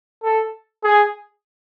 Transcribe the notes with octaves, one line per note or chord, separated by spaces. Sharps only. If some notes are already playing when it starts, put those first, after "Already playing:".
A4
G#4